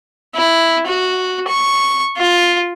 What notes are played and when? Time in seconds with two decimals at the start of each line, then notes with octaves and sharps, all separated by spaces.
0.35 E4
0.87 F#4
1.48 C#6
2.18 F4